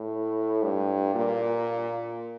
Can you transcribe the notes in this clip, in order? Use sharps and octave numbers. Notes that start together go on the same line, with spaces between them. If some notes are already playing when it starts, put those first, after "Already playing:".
Already playing: A2
G2
A#2